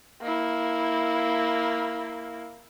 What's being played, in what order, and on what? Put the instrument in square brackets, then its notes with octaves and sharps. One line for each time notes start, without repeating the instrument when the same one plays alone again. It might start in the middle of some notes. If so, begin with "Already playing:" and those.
[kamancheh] A#3 E4